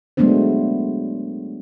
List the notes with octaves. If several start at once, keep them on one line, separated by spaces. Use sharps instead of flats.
F#3 G#3 A3 B3 D4 C5